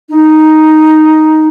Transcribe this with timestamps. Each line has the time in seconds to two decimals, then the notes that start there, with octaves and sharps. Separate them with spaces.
0.09 D#4